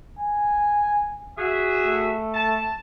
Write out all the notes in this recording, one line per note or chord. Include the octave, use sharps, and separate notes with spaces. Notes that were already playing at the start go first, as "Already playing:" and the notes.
G#5
F#4 G#4 E5
A3
A5